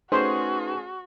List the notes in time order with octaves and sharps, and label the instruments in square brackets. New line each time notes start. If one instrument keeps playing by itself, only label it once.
[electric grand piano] A3 C#4 G#4 [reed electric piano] D#4 B4 C6 [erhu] F#4 [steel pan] C5